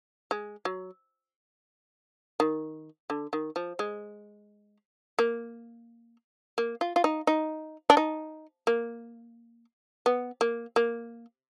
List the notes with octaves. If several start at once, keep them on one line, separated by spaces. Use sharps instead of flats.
G#3
F#3
D#3
D3
D#3
F3
G#3
A#3
A#3
F4
F4
D#4
D#4
D4
D#4
A#3
B3
A#3
A#3